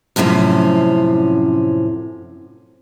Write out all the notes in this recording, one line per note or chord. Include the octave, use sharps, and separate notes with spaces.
F#2 A2 C3 F3 C#4